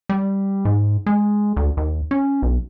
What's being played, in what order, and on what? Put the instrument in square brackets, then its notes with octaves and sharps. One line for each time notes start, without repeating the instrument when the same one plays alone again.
[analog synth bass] G3
G#2
G#3
D2
D#2
C#4
B1